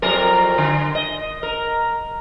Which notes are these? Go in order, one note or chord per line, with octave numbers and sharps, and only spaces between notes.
F2 F#3 A#4
D3
D#5
A#4